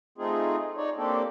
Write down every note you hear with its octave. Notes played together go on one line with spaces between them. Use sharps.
A3 C4 D#4 F4 G#4
D#4 C#5 D5
A#3 C4 D4 G4 A4